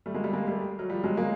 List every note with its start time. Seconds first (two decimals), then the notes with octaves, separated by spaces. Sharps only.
0.06 G3 A3
0.14 G#3 A#3
0.24 G3 A3
0.33 G#3 A#3
0.47 G3 A3
0.79 F#3
0.90 F3 G3
1.04 F#3 G#3
1.17 G#3 A#3